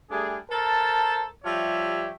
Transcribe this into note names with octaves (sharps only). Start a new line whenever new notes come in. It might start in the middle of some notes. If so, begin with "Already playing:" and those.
G3 A3 D4 G#4
A4 A#4 C5 A5
F3 G3 G4 C#5 E5